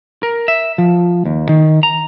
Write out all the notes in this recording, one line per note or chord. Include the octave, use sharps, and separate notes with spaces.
A#4
E5
F3
D#2
D#3
A#5